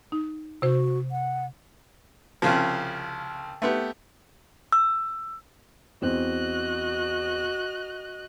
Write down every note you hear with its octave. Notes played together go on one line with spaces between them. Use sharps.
D#4
C3 F#4 C5
F#5
C2 C#3 F3
A3 B3 G4
E6
E2 C4 F#4 D#5 F#6